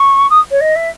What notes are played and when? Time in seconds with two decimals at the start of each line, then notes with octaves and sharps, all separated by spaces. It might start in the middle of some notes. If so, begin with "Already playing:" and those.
Already playing: C#6
0.30 D#6
0.51 C#5
0.60 D#5
0.75 E5